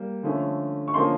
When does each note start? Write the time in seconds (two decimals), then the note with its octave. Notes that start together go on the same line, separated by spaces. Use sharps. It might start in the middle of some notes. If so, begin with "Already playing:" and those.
Already playing: G3 A#3
0.23 D3 F3 A3 C#4
0.88 C#6
0.94 D3 F3 A#3 C#4 C6